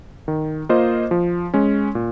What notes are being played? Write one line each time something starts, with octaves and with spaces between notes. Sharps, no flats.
D#3
A#3 F4 C5 D#5
F3
G#3 C#4
A#2